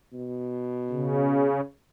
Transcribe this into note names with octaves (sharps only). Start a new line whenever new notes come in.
B2
C#3